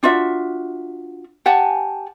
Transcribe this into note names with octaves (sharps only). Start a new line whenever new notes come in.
D4 F4 F#4 E5
G4 F#5 G#5 A5